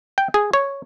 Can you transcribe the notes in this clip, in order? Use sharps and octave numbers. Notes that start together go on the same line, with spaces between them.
G5
G#4
C#5